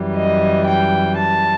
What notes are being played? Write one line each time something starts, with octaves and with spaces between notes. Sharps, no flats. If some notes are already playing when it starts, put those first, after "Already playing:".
Already playing: F#2 E3 G3
D#5
G5
A5